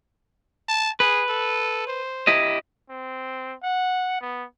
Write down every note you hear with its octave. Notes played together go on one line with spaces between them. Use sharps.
A5
G#4 B4
A4
C5
E4 G4 D#5
C4
F#5
B3